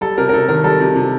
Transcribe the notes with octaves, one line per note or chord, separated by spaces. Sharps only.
G3 A4
C3 A#4
A#4
C3 A4
D#3 A#4
G3 A4
C3
C3